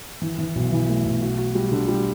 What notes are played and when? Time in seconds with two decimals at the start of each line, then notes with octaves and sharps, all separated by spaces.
0.22 E3
0.39 E3
0.55 B1
0.72 E3
0.89 A3
1.05 B1
1.22 F#4
1.38 F#4
1.55 G3
1.72 D3
1.88 G3